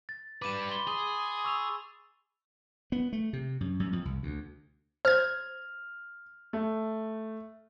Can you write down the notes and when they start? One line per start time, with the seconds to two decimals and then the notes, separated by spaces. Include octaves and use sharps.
0.09 A6
0.42 G3 B4 D6 D#7 E7
0.70 B5 C6 G7
0.87 G#4 D#6
1.44 C#6 E6 F7
2.92 B3
3.13 A3
3.33 C3
3.61 F#2
3.80 F#2
3.93 F2
4.05 C2
4.23 D2
5.05 C5 F6 G#6
6.53 A3